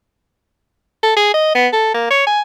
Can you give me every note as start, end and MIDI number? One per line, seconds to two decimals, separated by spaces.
1.03 1.12 69
1.17 1.32 68
1.34 1.52 75
1.55 1.68 59
1.73 1.93 69
1.94 2.06 58
2.10 2.26 73
2.27 2.41 80